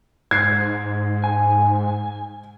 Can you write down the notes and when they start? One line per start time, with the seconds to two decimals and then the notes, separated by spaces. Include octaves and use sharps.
0.31 G#2 G#6 C7
1.24 G#5